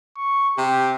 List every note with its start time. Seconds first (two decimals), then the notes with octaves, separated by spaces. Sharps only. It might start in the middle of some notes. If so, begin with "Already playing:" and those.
0.17 C#6
0.58 C3 G4